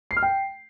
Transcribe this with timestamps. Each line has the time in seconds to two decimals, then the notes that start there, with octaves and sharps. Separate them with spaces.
0.11 C7
0.17 F6
0.23 G5